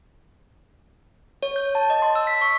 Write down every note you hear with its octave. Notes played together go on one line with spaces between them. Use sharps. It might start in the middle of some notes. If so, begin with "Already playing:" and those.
C#5
G6
A5
D#5
C6
E6
B6
C#6